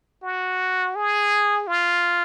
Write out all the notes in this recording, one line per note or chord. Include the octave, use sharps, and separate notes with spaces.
F#4
G#4
F4